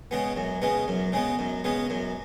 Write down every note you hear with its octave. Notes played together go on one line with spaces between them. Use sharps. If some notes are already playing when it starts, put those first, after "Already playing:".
C#3 G#3 B3
F#2
C#3 G#3 B3
F#2
C#3 G#3 B3
F#2
C#3 G#3 B3
F#2